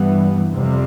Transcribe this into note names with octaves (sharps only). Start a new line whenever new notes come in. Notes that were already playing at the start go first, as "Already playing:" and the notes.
Already playing: G2 E3 G3 B3
F2 C3 G3 C4